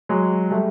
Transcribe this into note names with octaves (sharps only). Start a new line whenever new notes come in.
F#3 G#3
G3 A3